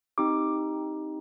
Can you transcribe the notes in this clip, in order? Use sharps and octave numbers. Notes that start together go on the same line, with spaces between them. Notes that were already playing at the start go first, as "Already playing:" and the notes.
C4 D#4 G4 D6